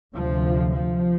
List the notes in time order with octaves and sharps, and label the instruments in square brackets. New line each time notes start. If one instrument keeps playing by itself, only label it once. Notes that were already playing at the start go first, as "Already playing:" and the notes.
[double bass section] D2 C3 F3
F3